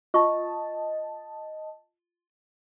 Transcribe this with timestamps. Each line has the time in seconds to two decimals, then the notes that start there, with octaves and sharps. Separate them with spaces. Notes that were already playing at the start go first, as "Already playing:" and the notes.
0.14 F4 D#5 A5 C#6